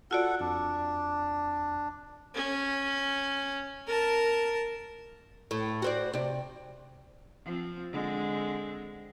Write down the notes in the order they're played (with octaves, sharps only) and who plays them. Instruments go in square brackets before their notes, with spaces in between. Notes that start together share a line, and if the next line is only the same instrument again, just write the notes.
[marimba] F4 F#4 D5 [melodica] A4 F#5
[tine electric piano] F2 [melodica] D4
[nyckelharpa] C#4
A#4 A5
[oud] A2
F#4 C5 D5
C3 D5
[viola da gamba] F3 C4
D3 G#3 C4